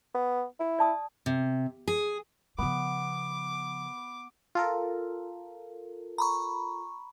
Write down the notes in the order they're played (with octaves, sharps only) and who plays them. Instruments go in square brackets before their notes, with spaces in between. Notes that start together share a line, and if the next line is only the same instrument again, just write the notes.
[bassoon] B3
E4
[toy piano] D5 A5 D#6
[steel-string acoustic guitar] C3
G#4
[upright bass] C#3 F3 [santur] B3 [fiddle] D6
[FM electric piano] F4 A4 A#4
[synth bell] A#5 B5 C#6